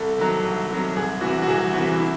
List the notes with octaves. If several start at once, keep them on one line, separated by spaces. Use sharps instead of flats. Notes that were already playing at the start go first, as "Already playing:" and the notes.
Already playing: C2 A4
C3 D#3 F#3
C2
C3 D#3 F#3
C2 G#4
C3 E3 F#4
F#4
C2 G#4
C3 E3 F#4
E4